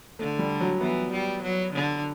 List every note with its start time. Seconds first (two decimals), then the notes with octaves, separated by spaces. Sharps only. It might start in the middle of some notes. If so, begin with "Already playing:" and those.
0.19 D3 A3
0.39 G3
0.61 F#3
0.81 E3 B3
1.12 G3
1.42 F#3
1.73 D3